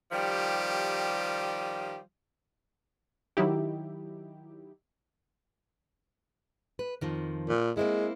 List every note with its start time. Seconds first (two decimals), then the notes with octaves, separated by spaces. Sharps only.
0.11 D#3 F3 G3 G4
3.37 D#3 F#3 D#4 E4 G4
6.79 B4
7.01 F2 D#3 F3
7.49 A#2
7.77 G#3 A#3 C4 E4